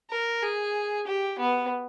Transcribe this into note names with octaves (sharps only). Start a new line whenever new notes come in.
A#4
G#4
G4
B3